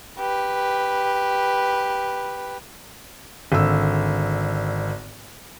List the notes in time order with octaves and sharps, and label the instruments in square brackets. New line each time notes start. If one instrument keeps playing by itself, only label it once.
[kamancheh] G4 B4
[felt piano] G#1 D3 E6